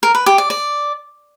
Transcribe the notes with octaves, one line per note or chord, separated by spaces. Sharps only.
A#4
B4
G4
D5
D5